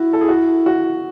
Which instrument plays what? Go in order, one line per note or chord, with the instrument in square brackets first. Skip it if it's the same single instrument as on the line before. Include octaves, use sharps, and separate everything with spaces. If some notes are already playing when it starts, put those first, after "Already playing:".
Already playing: [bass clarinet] E4 [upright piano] F#4
[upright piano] A4
G#4
F#4
F#4